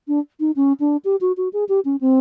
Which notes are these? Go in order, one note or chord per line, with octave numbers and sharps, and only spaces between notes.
D4
D#4
C#4
D4
G4
F#4
F#4
G#4
G4
C#4
C4